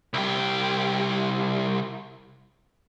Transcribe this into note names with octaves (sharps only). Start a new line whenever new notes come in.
C2 G4